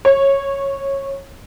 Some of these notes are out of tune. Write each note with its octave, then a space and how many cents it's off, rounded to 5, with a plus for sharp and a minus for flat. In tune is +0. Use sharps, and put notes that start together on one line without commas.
C#5 -20